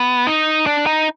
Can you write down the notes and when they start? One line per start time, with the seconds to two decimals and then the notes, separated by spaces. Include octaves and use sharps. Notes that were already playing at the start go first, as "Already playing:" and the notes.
Already playing: B3
0.27 D#4
0.66 D4
0.86 D#4